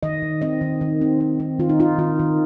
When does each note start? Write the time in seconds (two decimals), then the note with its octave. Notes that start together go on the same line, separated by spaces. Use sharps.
0.03 D#3 D#5
0.22 D#3
0.42 C4 D#5
0.61 D#3
0.81 D#3
1.01 C4
1.20 C4
1.40 C4
1.59 D#3 F4
1.69 D#4
1.80 D#4 F4
1.99 D#3 F4
2.19 D#3